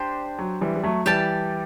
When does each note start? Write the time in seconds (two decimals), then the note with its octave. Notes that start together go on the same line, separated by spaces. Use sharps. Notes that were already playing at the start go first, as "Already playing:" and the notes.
Already playing: D4 G4 C5
0.39 F#3
0.61 E3 G3
0.76 G3
0.83 F#3 A3
1.06 E3 G3 G4 D5 A5